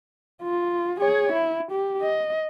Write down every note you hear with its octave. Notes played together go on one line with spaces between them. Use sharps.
F4
G#4 C#5
E4
G4
D#5